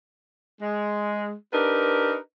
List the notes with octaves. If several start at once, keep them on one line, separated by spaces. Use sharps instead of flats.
G#3
D4 D#4 G4 A#4 B4